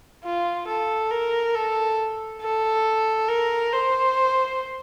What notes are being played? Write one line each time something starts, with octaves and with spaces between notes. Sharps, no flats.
F4
A4
A#4
A4
A4
A#4
C5